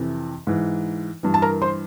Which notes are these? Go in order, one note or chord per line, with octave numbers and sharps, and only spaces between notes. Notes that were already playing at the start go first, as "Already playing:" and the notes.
Already playing: F2 C3 E3
G#2 E3
G2 E3
A5
A#4 A#5
C5 C6